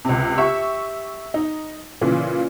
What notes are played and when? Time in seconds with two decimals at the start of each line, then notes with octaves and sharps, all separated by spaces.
0.05 C#2 C3
0.38 G4 E5 C#6
1.34 D#4
2.01 A#2 C#3 E3